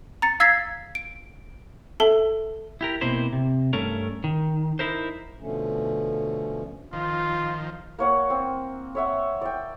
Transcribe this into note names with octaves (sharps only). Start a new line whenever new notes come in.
A#5 A6 C#7
F5 E6 G#6 A6 B6 C7
D7
A4 E5 A5 G7
E4 G4 A#4
B2 A#3 C4 E4 C5
C3
G2 A3 C#4 A#4
D#3
D#4 E4 A#4 C5
B2 D3 F3 A3 C#4
D#3 F3 F4
A#3 C#5 F#5
C4
C#5 E5 F#5
D5 G5